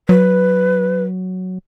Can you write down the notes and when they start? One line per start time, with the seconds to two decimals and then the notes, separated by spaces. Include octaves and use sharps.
0.09 F#3 B4